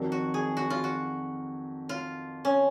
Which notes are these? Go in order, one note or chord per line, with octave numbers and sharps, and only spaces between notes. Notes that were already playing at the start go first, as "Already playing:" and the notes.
Already playing: F2 D#3 F#3
F#4
G#4
F#4
F4
F#4
F4
C#4